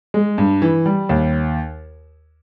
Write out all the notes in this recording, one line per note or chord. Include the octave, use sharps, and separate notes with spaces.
G#3
G2
E3
G3
D#2